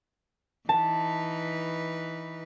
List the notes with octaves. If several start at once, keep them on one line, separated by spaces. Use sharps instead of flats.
E3 D#4 B4 A5